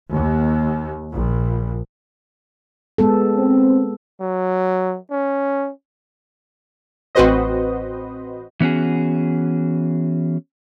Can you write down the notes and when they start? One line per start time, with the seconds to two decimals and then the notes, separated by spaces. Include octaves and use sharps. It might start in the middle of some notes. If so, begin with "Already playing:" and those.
0.12 D#2
1.13 A#1
2.98 G#3 B3 A4
3.37 C4
4.21 F#3
5.11 C#4
7.15 A1 C4 F#4 B4 C5 D#5
8.61 E3 B3 C#4 F#4 G#4